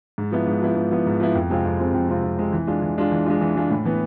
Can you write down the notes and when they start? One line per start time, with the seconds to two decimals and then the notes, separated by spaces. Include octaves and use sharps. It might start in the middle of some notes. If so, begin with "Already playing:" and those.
0.18 G#2
0.32 F3 B3 E4
0.47 G#2
0.62 F3 B3 E4
0.76 G#2
0.91 F3 B3 E4
1.06 G#2
1.20 F3 B3 E4
1.35 F2
1.49 C3 G#3 C4 F4
1.65 F2
1.79 C3 G#3 C4 F4
1.94 F2
2.08 C3 G#3 C4 F4
2.23 F2
2.38 C3 G#3 C4 F4
2.53 E3
2.67 G#3 D4 F4
2.82 E3
2.98 G#3 D4 F4
3.12 E3
3.26 G#3 D4 F4
3.41 E3
3.56 G#3 D4 F4
3.71 A2
3.85 E3 B3